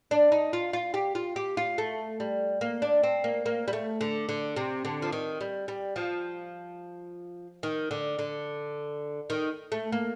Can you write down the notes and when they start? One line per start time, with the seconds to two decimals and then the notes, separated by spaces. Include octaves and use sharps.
0.11 D4
0.32 D#4
0.53 F4
0.73 F4
0.94 G4
1.15 F4
1.36 G4
1.57 F4
1.78 A3
2.20 G3
2.61 A#3
2.82 D4
3.03 C4
3.24 A#3
3.46 A#3
3.68 G3
3.73 A3
4.01 D3
4.29 D3
4.56 C3
4.85 D3
5.02 F3
5.12 D#3
5.41 G3
5.68 G3
5.96 F3
7.63 D#3
7.91 D3
8.19 D3
9.30 D#3
9.72 A3
9.92 A#3